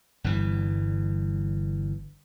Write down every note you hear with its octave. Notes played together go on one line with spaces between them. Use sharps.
G1 G2 E3